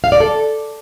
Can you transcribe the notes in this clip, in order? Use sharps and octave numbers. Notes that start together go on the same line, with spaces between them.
F5
D5
A4